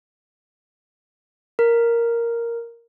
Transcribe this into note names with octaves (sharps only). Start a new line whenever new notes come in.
A#4